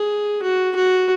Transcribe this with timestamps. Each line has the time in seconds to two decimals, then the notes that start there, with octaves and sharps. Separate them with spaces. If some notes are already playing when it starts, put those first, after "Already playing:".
Already playing: G#4
0.42 F#4
0.75 F#4